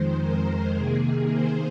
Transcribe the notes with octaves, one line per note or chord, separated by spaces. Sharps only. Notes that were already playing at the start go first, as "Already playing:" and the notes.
Already playing: F2 D#3 G#3 C5
A#4
C3 D#3 A#3 G#4
C5